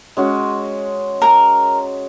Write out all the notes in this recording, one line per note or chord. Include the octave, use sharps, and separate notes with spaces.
G#3 C#4 F#4
A#4